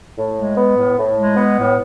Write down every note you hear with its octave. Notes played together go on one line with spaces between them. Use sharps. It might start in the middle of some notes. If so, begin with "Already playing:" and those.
A2
G#3
B3
A2
A2
G#3
B3
A2